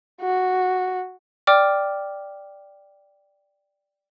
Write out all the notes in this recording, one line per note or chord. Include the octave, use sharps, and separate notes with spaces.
F#4
D5 G5 D6 F6